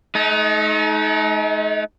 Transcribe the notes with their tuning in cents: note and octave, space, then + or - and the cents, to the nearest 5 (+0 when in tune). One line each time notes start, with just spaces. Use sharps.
A3 -45 D#4 +15